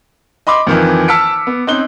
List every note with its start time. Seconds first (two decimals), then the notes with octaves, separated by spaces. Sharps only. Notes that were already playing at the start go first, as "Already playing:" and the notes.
0.47 D#5 B5 C6 D6
0.67 F2 D#3 E3
1.08 A5 E6 F6 B6 C#7 D7
1.47 B3
1.67 C4 C#4 D#4 F#6 G7